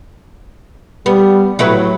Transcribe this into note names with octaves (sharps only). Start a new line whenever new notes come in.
G3 B3
A2 F#3 E4 B4